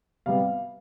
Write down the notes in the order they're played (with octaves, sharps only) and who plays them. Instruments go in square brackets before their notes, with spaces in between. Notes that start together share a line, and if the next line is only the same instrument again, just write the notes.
[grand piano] C3 G3 B3 F5